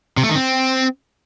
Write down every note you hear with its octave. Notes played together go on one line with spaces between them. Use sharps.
C3
A3
D#3
C4